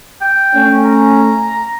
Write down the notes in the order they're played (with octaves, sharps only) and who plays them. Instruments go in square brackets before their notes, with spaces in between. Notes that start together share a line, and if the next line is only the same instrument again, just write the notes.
[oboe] G5
[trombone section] A3 C#4
[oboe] A#5